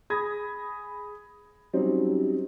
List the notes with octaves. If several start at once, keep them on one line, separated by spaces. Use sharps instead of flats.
G#4 B5 D#6 G#6 A#6
F#3 G3 C4 C#4 D#4